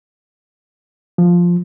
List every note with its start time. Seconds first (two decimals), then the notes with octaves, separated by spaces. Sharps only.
1.18 F3